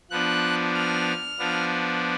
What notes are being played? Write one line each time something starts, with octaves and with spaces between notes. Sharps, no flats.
F3 B3 D4 F#6
F6
F3 B3 D4